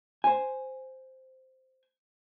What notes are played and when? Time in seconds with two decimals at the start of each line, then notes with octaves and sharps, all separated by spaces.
0.24 C5 G#5